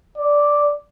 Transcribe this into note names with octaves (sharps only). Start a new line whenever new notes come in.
D5